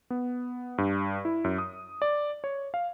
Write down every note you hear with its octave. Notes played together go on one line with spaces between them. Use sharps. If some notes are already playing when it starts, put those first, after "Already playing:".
B3
G2
E4
F#2
D#6
D5
C#5
F5